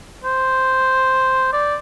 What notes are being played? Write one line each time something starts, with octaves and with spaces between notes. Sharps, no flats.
C5
D5